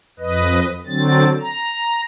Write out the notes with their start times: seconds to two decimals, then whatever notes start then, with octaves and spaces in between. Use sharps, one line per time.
0.19 F2 B4 D#5
0.86 D3 F#3 C4 A6
1.41 A#5